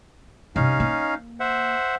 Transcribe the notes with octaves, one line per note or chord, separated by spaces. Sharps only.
G2 C3 C#4 D#4 F5
A#3
C5 E5 F#5